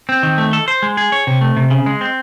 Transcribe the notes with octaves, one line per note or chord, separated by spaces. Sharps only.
C4
D#3
A3
A4
C5
G#3
G#4
C#5
C3
A3
C3
C#3
G#3
C4